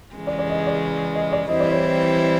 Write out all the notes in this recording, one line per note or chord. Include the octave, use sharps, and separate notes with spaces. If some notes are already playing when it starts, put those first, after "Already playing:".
C#3 E3 G#3
D5
D5
D#5
D5
D#5
D5
E3 G3 C4 E4 D#5
D5
C#5